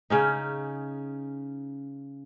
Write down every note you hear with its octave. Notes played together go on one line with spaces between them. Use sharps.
C#3 C#4 D#4